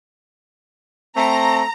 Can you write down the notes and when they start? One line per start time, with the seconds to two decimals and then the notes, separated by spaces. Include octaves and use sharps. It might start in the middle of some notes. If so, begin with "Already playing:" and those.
1.17 A3 C4 A#5